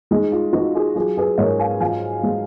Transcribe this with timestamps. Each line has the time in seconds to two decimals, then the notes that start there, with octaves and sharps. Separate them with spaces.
0.11 G#3 D#4
0.32 F4
0.53 F3 D#4 F#4
0.74 F4 G#4
0.95 F#3 F4 G#4
1.17 G#4 B4
1.38 G#2 A#4 C#5
1.59 F5 G#5
1.80 F3 F5 G#5
2.23 G#3